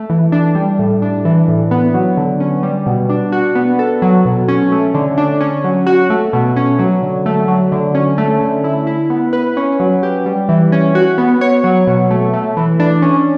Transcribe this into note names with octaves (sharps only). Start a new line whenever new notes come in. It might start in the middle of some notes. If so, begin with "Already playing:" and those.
Already playing: A3
E3
D4
G3
A2
D4
E3
A2
B3
F#3
D3
C#4
G3
B2
D4
F#4
B3
A4
F#3
B2
C#4
A3
D3
D4
C#4
F#3
F#4
A3
B2
C#4
F#3
D3
A3
F#3
D3
C#4
A3
D3
E4
E4
B3
B4
C#4
F#3
G4
G3
E3
C#4
F#4
B3
C#5
F#3
B2
A3
A3
E3
D4
C#4